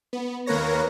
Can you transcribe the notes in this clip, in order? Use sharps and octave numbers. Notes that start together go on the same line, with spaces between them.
B3
D#2 A#3 A#4 B4 C#5 A#6